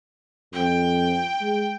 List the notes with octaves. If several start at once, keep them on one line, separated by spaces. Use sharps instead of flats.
F2 G5
G#3